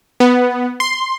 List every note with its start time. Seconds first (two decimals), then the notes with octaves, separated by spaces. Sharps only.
0.20 B3
0.80 C6